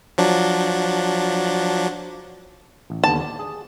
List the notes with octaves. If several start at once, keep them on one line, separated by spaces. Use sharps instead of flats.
F3 F#3 D4
A1
D#2 D3 B3 A5
D5
G#4